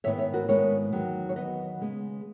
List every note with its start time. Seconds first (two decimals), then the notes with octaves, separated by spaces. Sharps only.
0.04 G#2 D#3 G#3 B3 E4 C#5 E5
0.19 C#5 E5
0.34 F#4 A#4
0.48 G#2 D#3 G#3 B3 E4 A#4 C#5
0.92 E2 D#3 F#3 B3
1.29 C#5
1.35 E2 D#3 F#3 B3 B4 D#5
1.80 C#3 G#3 B3